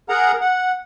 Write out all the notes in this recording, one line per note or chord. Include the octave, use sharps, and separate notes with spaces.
G#4 A#4 F#5 A#5
F#5